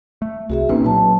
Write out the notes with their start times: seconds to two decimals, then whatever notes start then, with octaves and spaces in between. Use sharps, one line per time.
0.22 A3
0.50 C2 F#4 G#4 E5
0.69 A#1 A#3 C4 C#4 D#4 B4
0.85 A#2 F#3 B4 A5